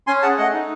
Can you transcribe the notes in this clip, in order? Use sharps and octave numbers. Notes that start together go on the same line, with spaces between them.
C#4 G#5 C6
G#4 F#5 A5
A3 D#5 F#5
D#4